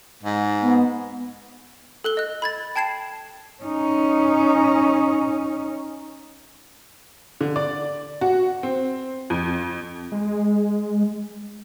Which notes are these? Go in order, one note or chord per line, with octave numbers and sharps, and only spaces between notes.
G#2
B3
A4 F#6 G7
D#5 F#6
B5 G#6 A6
G5 A5 G#6 C7 E7
C#4 D#4
D3
D5
F#4
C4
F2
G#3